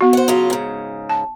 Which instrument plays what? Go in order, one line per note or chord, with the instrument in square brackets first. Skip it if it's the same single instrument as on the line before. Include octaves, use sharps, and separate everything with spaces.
[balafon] B3 F#4
[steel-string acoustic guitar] C5 F#5
C#3 F#3 F4
G#2 C#3
[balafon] A5